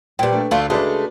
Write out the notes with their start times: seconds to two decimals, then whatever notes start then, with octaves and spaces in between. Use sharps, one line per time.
0.19 A#2 G3 B4 C5 D5 G5
0.32 A3 D4
0.51 D2 A3 D4 F4
0.70 C#3 G#3 A3 D4 F#4 G#4 B4 D5